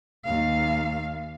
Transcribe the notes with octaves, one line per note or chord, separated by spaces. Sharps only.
D#2 F5